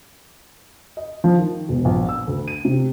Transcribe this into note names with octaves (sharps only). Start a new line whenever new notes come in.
D#5
F3
D#3
E1
A#1
E6
D2
D#7
C3